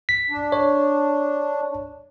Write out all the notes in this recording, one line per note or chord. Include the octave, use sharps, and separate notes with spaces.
B6
D4
C#5